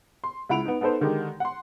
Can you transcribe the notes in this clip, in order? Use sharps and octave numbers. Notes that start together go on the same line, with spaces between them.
C6
C#2 E4 F#5 B5 D7 F7
B3 D#4
B3 D#4 A4 B4 C5
D3 D#3 G#3 D#4 G4
F#5 C6